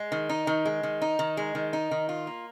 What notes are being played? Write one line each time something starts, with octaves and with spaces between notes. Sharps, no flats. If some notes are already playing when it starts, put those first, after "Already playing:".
Already playing: G#3
D#3
D#4
D#3
G#3
D#3
D#4
D#3
G#3
D#3
D#4
D#3
F4
A#3